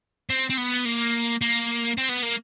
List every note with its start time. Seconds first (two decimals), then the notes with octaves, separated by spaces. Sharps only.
0.30 C4
0.50 C4
0.57 B3
0.85 A#3
1.41 A#3
1.98 C4
2.09 B3
2.23 A#3